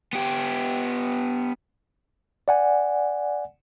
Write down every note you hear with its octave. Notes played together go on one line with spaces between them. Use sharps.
B3 G4
D5 F#5 G#5